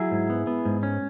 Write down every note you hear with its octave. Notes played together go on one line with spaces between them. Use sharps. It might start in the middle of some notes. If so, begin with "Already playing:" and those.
Already playing: F#3 E4 G#4
G#2
B3
B3
G#2
C#4